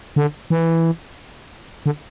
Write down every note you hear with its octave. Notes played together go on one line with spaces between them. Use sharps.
D3
E3
D3